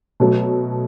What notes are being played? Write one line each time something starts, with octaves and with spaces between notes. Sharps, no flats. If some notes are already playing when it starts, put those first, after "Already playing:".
B2 F#3 A3